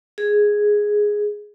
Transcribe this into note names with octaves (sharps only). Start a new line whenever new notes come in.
G#4